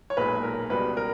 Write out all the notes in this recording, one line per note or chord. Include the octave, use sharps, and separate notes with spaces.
C#5
B1 A#2 G#3 B4
A#4
C#2 B2 G3 B4
A#4